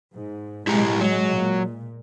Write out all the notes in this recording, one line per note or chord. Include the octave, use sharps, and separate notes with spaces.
G#2
B1 A2 G#3 E4 G4 A#5
F#3 G#3
A#2